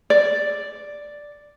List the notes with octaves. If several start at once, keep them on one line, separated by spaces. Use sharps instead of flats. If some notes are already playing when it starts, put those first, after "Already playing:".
D5